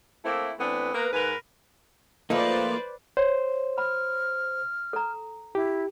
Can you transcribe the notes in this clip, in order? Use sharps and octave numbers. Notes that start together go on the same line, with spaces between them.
A3 A#3 C4 E4
E3 A3 B3 C4 D4
A#3 B3 A#4 B4
G#2 A#4 B4
F3 A3 A#3 D#4 F4 B4 C5 D5
C5 C#5
B5 F6
A4 A#5
E4 G4